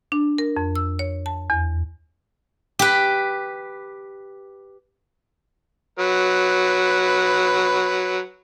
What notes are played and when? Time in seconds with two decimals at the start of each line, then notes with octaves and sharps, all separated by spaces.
0.12 D4
0.38 A#4
0.57 F2
0.76 E6
0.99 C#5
1.26 A5
1.50 E2
2.79 G4 B4
5.99 F#3 B4